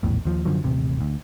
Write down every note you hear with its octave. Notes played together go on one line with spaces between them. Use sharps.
A#1 E2 A2
D#2 F3
F#2 D3 F3 F#3
D#1 A1 C3
D2